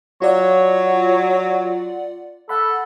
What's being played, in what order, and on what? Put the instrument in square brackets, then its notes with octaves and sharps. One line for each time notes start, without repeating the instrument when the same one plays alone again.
[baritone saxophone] F#3 [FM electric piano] F4 D5 F#5 [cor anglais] C#5
[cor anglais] A4 [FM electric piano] F#5 B5